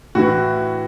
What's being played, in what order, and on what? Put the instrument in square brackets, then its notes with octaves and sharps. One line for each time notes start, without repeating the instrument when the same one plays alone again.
[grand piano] A2 E3 F#4